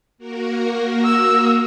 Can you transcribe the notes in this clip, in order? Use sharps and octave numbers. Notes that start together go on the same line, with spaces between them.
A#3 F#4 A#4
E6